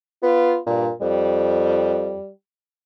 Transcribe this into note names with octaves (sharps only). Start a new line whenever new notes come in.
B3 F4
G2 A#2
F2 G3